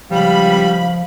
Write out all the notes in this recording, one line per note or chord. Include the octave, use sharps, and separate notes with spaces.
C#2 F3 G3 F5 B5